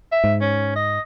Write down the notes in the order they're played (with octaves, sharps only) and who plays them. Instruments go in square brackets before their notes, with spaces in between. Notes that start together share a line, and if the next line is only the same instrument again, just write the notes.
[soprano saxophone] E5
[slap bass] G#2
[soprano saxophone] C#4
D#5